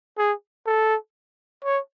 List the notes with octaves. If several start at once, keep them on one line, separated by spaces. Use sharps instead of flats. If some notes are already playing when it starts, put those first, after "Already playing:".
G#4
A4
C#5